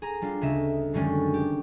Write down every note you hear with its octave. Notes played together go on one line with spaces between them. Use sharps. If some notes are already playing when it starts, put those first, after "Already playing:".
G#4 A#5
G3 D4 F4
D2 C#3 D#5 E5
F#2 D3 D#3 G3 G#3 C#4
G4